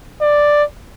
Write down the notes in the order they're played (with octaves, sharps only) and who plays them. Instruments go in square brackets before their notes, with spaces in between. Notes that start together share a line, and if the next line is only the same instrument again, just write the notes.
[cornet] D5